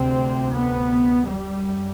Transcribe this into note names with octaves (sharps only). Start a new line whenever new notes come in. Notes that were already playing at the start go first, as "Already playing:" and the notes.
Already playing: D2 C3 C4
B3
F#2 G3